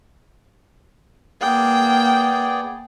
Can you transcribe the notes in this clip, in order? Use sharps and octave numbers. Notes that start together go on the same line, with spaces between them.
A#3 B3 G#4 D5 G5